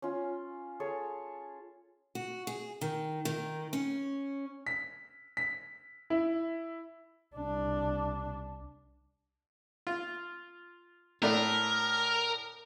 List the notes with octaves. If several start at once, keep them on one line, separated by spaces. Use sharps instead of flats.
C#4 F4
G#4 A4 C#5 C#6
F#4
G#4
D#3
D#3
C#4
B6
B6
E4
C2 D4
F4
A2 A3 D4 A#4